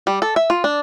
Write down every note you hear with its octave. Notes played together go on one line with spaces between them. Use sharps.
G3
A4
E5
F4
D4